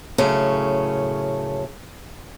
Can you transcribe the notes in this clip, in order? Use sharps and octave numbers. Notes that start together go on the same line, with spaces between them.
F#2 A2 C#3 A3 C#4